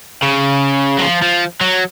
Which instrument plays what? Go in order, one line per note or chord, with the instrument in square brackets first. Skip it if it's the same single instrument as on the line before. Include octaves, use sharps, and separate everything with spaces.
[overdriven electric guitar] C#3
F#3
F3
F3
F#3